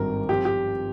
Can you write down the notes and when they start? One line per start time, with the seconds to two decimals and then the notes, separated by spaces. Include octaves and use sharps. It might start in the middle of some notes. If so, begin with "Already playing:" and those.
Already playing: G#1 G2 G3 C4 G4 A#4
0.29 G2 F3 C4 F4 G4
0.45 G4